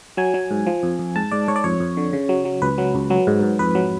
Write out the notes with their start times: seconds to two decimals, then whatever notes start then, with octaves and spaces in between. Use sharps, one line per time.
0.17 F#3 G#5
0.34 F#3
0.51 G#2
0.66 F3
0.83 F2
0.99 F2
1.16 G#2 A5
1.31 G#2 D5
1.48 G#2 C#5
1.56 D5
1.64 F2 C#5
1.80 F2
1.97 D3
2.13 C#3
2.29 F#3
2.45 F#3
2.62 C#2 B4
2.78 F#3
2.94 C#2
3.10 F#3
3.27 G#2
3.42 G#2
3.59 F2 B4
3.75 F#3